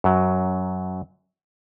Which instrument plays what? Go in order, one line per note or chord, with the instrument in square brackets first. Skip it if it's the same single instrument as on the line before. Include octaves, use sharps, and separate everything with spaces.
[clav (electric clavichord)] F#2 F#3